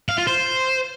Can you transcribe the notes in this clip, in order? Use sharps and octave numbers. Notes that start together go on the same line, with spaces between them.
F5
F4
C5